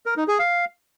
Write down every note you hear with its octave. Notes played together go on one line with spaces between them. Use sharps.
A#4
D#4
G#4
F5